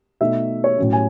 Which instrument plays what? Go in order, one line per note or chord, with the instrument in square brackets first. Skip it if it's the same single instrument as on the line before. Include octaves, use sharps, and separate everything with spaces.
[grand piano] B2 A3 D#4 E5
C#5
A2 F#3 C#4
G#5